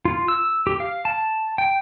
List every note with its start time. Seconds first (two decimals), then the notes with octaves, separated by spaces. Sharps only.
0.05 F4
0.28 E6
0.67 G4
0.80 F5
1.05 A5
1.58 G5